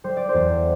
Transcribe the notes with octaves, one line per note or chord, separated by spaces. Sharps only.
G3 C5
D5
C5
E2